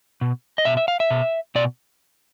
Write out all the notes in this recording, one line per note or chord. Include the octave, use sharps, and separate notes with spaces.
B2
D#5
B2 E5
E5
F5
E5
B2
B2 D5